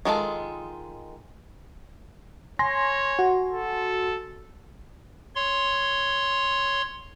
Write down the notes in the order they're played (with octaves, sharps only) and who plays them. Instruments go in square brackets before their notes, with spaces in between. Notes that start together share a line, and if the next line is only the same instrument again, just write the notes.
[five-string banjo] D#3 G#3 F4 A4
[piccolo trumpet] C#5 [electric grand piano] G#5 C6 A#6
[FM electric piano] F#4
[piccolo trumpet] A4
[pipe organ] C#5 C6